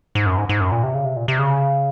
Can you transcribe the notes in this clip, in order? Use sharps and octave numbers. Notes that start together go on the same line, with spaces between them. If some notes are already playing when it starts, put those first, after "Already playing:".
G#2
F#2
G#2
G#2
F#2
A#2
C3
C#3
C3
A#2
C3
C#3